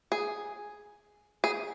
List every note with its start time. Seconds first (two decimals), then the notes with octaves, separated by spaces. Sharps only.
0.12 G#4
1.44 G#4